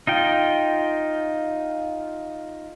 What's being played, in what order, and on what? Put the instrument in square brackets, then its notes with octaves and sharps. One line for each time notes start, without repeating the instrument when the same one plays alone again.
[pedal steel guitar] D#4 F4 G5